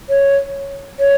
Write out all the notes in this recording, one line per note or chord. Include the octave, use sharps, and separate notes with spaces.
C#5
C#5